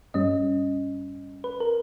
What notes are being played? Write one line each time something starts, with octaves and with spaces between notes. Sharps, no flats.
G2 G3 C#4 D#5
B4
A#4